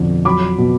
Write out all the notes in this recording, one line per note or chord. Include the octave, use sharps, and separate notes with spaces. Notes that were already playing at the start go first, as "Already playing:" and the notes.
Already playing: F2 B2 D3
F#3 B5 D6
B2